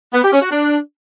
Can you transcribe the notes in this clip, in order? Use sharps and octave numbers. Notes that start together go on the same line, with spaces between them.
B3
G4
C#4
F#4
D4